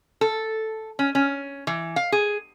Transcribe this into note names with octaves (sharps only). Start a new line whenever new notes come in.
A4
C#4
C#4
E3
F5
G#4